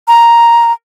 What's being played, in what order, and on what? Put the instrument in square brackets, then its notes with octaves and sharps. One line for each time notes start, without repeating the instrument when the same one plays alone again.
[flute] A#5